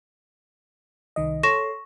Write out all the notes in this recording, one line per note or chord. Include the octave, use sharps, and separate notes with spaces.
C2 D#3 D#5
A4 C#5 C6 C#6 A#6 E7